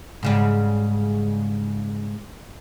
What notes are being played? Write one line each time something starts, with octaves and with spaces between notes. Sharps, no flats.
G#2 C#3 G3